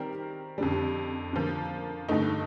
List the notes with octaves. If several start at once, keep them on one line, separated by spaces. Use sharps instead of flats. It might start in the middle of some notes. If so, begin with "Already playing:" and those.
Already playing: D#3 G3 C4 G4 A#4
F2 D3 G3
D3 F3 A#3
G2 D3 A3 D#4